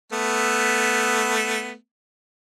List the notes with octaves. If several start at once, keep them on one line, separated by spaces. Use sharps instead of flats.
A3 B3